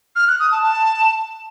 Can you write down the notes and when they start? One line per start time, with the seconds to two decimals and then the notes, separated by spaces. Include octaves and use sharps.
0.16 F6
0.28 F#6
0.40 D#6
0.52 A5
0.64 A5